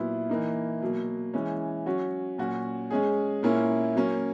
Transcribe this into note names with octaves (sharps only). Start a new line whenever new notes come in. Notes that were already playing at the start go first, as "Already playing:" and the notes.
Already playing: A#2 F#3 B3 E4
E3 A#3 D#4
B2 F#3 A#3
E3 G#3 C#4
F#3 C#4 F#4
A#2 F#3 C#4 F#4
G#3 C#4 G#4
A#2 A#3 C#4 E4
F#3 A#3 C#4